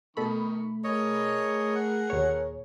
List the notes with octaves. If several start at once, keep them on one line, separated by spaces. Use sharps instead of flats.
B2 D#3 A3 A4 B5 C#6
G#4 A#4 C#5 D#5
F#5
D#2 A#2 C#5